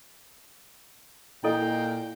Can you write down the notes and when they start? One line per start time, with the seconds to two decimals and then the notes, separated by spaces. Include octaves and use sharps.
1.44 A#2 E4 A4 D#5 G5